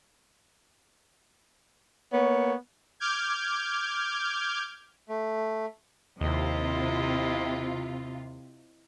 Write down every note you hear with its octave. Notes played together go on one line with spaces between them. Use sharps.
A#3 B3 C#5
D6 F6 G6 G#6
A3
D#2 C3 E4 F4 D#5